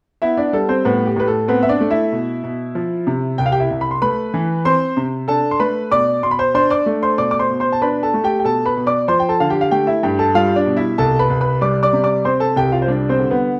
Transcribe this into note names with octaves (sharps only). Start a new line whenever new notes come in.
B3 E4 E5
D4 D5
G3 A4
C4 C5
A2 B3 B4
G4
A2 B4
A4
B3 C4 B4
E5
D4 D5
A3
E4 E5
B2
B2
F3
C3
C2 G5
F5
G4 G5
E4 E5
C2
B5
C6
A3 B4 B5
E3
C4 C5 C6
C3
D4 A4 A5
C6
A3 B4 B5
B2 D5 D6
B2 C6
B5
C5 C6
D4 C5 C6
D5 D6
A3
C5 C6
B2 D5 D6
D6
C5 C6
B2
C5 C6
A5
D4 B4 B5
A4 A5
A3
G4 G5
G5
B2 A4 A5
B4 B5
B2
D5 D6
F3 C5 C6
G5
A4 A5
D3 F5
G4 G5
F5
A3 G4 G5
E4 E5
G2 G4 G5
A4 A5
G3 F4 F5
D4 D5
B2
E4 E5
C2 A4 A5
B4 B5
C2
B4 B5
G3 D5 D6
D5 D6
C3
D5 D6
C4 C5 C6
A4 A5
C2 G4 G5
F4 F5
C5
G3 D4 D5
C4 C5
D3
B3 B4